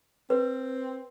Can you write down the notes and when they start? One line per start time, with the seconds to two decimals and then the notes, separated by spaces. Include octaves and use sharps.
0.30 C4 B4